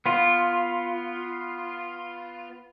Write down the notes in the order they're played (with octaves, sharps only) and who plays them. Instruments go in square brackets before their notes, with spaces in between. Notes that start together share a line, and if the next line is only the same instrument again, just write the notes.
[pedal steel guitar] B3 F4